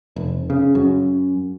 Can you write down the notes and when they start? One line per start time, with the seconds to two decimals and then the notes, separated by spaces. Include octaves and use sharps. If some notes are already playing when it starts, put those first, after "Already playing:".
0.16 F1
0.50 C#3
0.75 F#2